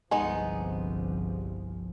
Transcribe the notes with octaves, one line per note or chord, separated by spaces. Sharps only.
G1 C2 F3 G#3 B3 D#4 G#5